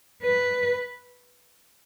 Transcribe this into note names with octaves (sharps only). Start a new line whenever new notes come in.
B4